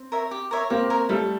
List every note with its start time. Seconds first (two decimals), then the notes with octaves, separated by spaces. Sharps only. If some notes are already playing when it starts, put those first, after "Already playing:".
Already playing: C4
0.12 A#4 C#5 E5
0.31 G4
0.51 A#4 C#5 E5
0.70 A#3 C4 G4
0.90 A#4 C#5 E5
1.09 G3 A3 A4